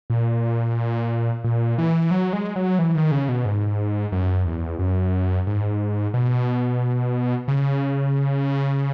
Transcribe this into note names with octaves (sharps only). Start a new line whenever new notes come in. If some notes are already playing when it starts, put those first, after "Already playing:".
A#2
A#2
E3
F#3
G#3
F#3
E3
D#3
C#3
B2
G#2
F#2
E2
F#2
G#2
B2
C#3